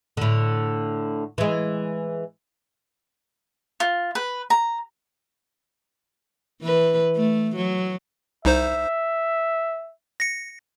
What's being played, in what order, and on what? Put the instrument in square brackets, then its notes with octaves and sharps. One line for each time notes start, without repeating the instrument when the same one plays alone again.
[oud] A2 D3
E3 G#3
[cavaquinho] F4
B4
A#5
[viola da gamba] E3 B4
A3
F#3
[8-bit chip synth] C2 D#4 C5 [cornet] E5
[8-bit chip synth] A#6 C#7